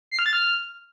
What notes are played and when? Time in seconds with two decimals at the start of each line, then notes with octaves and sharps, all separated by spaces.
0.11 C7
0.19 F6
0.26 A6
0.33 F6